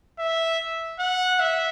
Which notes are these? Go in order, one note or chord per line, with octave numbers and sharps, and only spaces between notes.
E5
F#5
E5